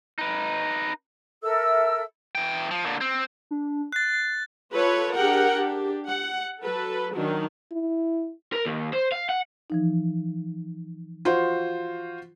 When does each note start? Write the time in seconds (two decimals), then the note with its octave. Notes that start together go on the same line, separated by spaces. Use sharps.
0.18 D#4 B4
1.42 A4 A#4 E5 E6
2.35 E3 G5
2.71 F3
2.85 A#2 D3
3.01 C4
3.51 D4
3.92 F#6 A6 C7
4.72 F4 A4 B4 C#5
5.15 D4 G4 G#4 A#4 F#5 G5
5.54 D4 G4
6.07 F#5
6.62 F#3 A4 B4
7.14 D#3 F#3 D4
7.72 E4
8.53 A#4
8.66 D#2
8.93 C5
9.12 F5
9.29 F#5
9.70 E3 F3 D#4
11.25 F4 F#4 C5